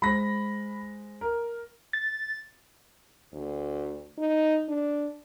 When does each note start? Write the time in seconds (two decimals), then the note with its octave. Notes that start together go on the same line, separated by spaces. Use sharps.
0.02 G#3 C5 B5 A#6
1.21 A#4
1.93 A6
3.33 D2
4.18 D#4
4.68 D4